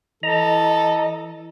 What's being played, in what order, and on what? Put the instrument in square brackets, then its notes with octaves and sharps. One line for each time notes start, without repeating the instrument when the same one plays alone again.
[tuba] E3 [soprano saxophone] A4 [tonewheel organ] D#5 A#5